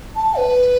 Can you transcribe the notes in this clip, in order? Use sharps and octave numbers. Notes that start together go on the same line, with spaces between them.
A5
B4